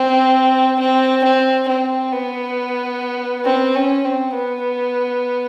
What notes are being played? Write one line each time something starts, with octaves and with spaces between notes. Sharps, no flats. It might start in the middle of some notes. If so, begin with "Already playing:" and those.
Already playing: C4
C4
C4
C4
B3
C4
C#4
C4
B3